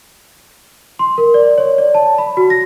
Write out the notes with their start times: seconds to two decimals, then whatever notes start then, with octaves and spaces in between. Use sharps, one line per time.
0.99 C6
1.18 A#4
1.34 D5
1.58 C#5
1.78 D5
1.94 A5
2.18 B5
2.37 F#4
2.50 A#6